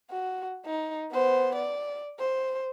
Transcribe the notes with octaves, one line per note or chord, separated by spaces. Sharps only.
F#4
D#4
B3 C5
D5
C5